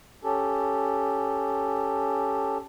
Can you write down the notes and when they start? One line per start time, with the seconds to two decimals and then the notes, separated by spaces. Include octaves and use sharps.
0.24 C#4 G4 A4